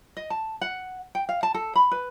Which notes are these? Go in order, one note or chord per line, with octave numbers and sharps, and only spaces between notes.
D#5
A5
F#5
G5
F5
A5
A4
B5
B4